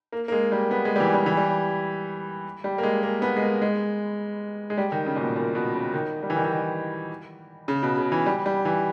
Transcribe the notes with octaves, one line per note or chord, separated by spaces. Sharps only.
A#3
A#3
G#3
G3
B3
G#3
G3
E3
G3
E3
G3
G3
A#3
G#3
A#3
B3
G#3
A#3
G#3
G#3
G3
D#3
C#3
A#2
B2
A#2
B2
C#3
D#3
G3
E3
D#3
E3
D#3
C#3
B2
C#3
E3
G3
G3
E3